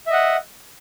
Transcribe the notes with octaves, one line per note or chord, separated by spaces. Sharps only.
D#5 E5 F#5